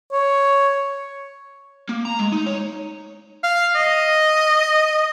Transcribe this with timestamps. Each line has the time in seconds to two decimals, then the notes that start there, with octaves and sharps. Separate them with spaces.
0.13 C#5
1.89 A#3
2.05 A#5
2.19 G#3
2.32 D#4
2.46 C#5
3.43 F5
3.75 D#5